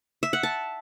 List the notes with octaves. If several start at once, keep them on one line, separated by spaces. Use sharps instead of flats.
E5
F#5
A5